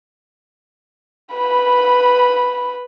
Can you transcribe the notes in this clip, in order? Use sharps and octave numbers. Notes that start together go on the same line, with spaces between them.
B4 B5